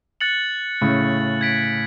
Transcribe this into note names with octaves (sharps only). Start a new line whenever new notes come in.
F#6 A6 C#7 F#7
A2 C#3
G#6 B6 D7